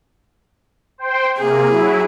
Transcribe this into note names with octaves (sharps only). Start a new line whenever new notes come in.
C5 G5 C6
C3 A#3 G#4
F#3 E4